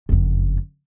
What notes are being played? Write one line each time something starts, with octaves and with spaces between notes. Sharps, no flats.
F#1 F2